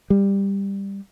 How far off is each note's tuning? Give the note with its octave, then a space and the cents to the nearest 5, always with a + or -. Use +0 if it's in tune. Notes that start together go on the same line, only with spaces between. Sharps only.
G3 +10